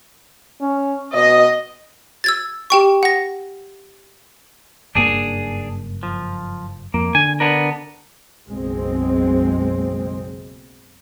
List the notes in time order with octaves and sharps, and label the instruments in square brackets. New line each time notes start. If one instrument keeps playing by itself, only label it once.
[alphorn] C#4
[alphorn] B2 [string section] D#5
[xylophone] E6 G#6 A6
G4 G5 C#6
F#5 A#6
[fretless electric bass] F#1 G2 A#3 [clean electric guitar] D4 G#4
[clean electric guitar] F3
[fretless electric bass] F2 [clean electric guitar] A#3
[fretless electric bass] D3 [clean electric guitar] G#5
[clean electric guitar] B3 D4 A#4
[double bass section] F#1 B1 G#3 C4